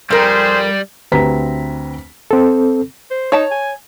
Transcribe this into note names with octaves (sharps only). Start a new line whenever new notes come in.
F2 G3 G#4 A#4 C5
D2 C4 G4 B4 A#5 B6
C4 A4
C5
D#4 C#5 A5
G#5